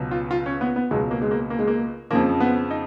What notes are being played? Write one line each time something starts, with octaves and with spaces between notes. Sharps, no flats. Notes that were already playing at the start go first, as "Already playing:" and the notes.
Already playing: C#2 B2 F#3
F4
F4
C#4
B3
B3
C#2 B2 F#3 G#3
A#3
G#3
A#3
A#3
G#3
A#3
F2 C#3 F3 A#3
B3
D#4